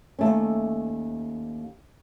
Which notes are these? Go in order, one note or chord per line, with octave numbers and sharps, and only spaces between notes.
D#2 A3 C#4